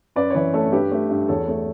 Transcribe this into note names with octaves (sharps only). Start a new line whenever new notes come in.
F#2 B4 D5
C#5
E3 B4 D5
A3 A4 C#5
G2 G4 B4
A3
G2
E2 A4 C#5
A3